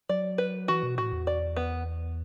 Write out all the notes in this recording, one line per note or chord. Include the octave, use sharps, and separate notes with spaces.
F#3 D5
B4
E3 F#4
B2
A2 F#4
E2
D5
B3